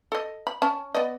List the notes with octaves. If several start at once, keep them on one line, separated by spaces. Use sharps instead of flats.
A4 D#5
B5
C#4 A5
B3 D5 D#5